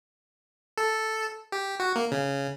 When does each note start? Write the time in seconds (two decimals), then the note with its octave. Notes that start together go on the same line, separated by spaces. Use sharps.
0.78 A4
1.52 G4
1.80 F#4
1.96 A#3
2.12 C#3